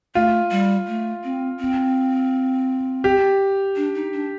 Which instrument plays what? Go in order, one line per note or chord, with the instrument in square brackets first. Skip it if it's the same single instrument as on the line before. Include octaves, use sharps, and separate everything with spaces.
[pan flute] A3 [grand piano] F4
[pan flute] G3
A3
C4
C4
[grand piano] G4
[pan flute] D4
D#4
D4